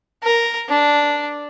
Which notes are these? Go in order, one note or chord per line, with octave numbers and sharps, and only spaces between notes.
A#4
D4